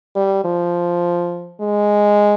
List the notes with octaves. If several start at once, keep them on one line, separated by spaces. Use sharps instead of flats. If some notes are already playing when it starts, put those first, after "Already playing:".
G3
F3
G#3